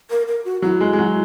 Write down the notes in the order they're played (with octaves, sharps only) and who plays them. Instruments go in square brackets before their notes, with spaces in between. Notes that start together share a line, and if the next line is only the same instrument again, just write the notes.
[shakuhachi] A#4
A#4
F#4
[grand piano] F#3 [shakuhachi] E4
[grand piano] G#3
G#3
F#3